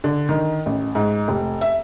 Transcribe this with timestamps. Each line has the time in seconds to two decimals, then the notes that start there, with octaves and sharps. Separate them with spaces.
0.04 D3
0.29 D#3
0.66 A1
0.95 G#2
1.28 F1
1.61 E5